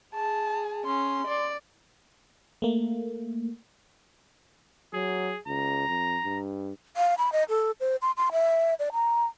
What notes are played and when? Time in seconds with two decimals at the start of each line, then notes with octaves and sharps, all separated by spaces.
0.14 G#4 A5
0.86 C#4 C6
1.27 D5
2.62 A3 A#3
4.93 F#3 G#4
5.47 C#2 A#5
5.88 F2
6.24 G2
6.97 F5
7.18 B5
7.32 D#5
7.49 A4
7.80 C5
8.02 C6
8.17 C6
8.32 E5
8.79 D5
8.93 A#5